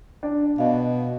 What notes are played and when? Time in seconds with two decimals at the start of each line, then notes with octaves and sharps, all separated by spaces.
0.23 D4
0.58 B2 D#5 F5